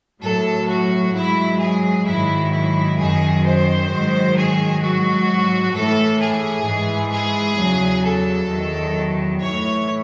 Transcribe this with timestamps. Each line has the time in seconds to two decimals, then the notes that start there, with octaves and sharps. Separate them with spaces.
0.22 A2 F#3 A4
0.68 F#4
1.13 G#2 F#3 E4
1.59 G#4
2.05 G#2 D#3 F#3 E4
2.52 E4
2.98 F#2 D#3 F#3 G#4
3.44 C5
3.90 G#2 D#3 F#3
4.36 G#4
4.81 G#2 F#3 F#4
5.74 A2 E3 A4
6.20 G#4
6.66 G#2 E3
7.11 G#4
7.57 E2 C#3 F#3
8.05 A4
8.50 E2 D#3 F#3
9.42 A2 E3 C#5